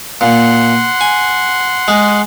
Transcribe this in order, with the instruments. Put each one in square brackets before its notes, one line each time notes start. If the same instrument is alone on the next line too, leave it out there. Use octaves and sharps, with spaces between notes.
[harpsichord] A#2 [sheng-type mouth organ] F#5 C6
[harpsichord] G#5
G#3